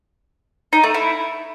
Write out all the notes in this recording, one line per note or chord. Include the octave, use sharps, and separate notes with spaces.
D#4
A3
E4